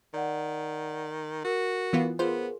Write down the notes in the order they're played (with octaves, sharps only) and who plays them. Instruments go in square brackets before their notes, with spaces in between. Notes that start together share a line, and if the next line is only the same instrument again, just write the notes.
[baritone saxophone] D#3 [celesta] D5 F#5
[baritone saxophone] F#4 [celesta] A#4
[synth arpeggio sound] E3 B3 F4
[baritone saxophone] B3 [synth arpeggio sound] F4 C5 [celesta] G#4 A#4